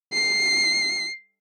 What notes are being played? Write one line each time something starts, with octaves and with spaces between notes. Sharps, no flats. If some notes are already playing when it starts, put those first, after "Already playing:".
C7